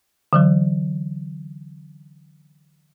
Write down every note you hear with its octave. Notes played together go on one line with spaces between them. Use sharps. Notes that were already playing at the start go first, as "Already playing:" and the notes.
D3 E3 F#3